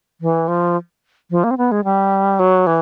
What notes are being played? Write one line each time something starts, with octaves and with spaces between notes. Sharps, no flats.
E3
F3
F3
A#3
C4
B3
G#3
G3
F#3
E3